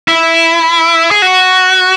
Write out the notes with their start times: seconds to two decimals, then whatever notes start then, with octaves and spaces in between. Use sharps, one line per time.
0.08 E4
1.11 G#4
1.22 F#4